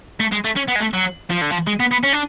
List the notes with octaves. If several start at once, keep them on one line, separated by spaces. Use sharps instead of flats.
A3
G#3
A3
C#4
B3
G#3
A3
F#3
F3
D3
F3
G#3
B3
B3
C#4
D4